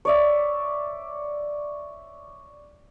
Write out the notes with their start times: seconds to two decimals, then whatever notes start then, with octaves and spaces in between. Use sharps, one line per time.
0.05 C#5 D5 E5